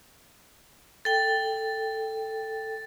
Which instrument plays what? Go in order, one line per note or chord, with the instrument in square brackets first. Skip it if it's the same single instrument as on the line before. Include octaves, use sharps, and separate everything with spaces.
[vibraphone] A4 G5 [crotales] A6